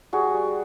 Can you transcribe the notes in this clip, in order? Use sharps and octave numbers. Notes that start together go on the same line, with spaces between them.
G3 F#4 G#4
G3